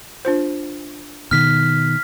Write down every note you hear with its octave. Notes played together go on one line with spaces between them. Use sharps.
D4 F4 C5
B2 D#3 F6 B6